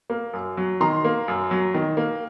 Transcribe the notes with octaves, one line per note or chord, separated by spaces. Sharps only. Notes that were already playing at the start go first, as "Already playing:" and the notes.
A#3
F#2
F#3
D#3 A#5 C6
A#3
F#2
F#3
D#3
A#3